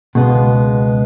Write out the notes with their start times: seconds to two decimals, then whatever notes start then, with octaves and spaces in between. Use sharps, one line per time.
0.15 C#2 B2 G#3 B3